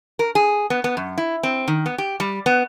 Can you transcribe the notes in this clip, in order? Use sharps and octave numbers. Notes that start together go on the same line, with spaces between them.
A#4
G#4
B3
B3
F#2
E4
C4
D#3
B3
G4
G3
B3